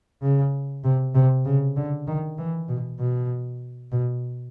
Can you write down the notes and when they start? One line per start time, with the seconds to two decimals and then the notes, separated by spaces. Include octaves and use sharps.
0.22 C#3
0.84 C3
1.15 C3
1.45 C#3
1.77 D3
2.08 D#3
2.38 E3
2.69 B2
3.00 B2
3.92 B2